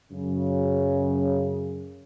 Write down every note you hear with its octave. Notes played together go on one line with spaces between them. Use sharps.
F#2 C#3